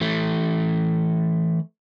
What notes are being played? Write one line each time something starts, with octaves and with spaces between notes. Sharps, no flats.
E3 A3